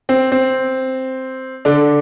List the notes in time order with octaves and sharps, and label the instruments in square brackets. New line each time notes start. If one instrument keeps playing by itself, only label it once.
[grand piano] C4
C4
D3 D4